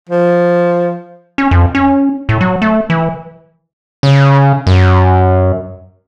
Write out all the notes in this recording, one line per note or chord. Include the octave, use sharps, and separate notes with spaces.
F3
C#4
F2
C#4
A2
F#3
A3
E3
C#3
F#2